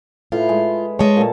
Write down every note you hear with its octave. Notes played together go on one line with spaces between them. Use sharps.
A2 F4 B4
G#3
G#3 C#5 A5
A#2 A4